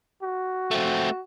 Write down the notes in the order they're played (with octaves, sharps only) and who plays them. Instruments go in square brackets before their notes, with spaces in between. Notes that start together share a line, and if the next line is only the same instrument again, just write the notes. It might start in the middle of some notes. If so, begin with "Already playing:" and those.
[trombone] F#4
[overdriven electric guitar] A3 C4